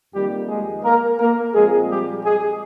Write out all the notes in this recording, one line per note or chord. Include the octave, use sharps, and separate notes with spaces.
F2 D#3 G3 A#3 G4
G#3 G#4
A#3 A#4
A#3 A#4
A#2 F3 G#3 C4 G#4
G3 G4
G#3 G#4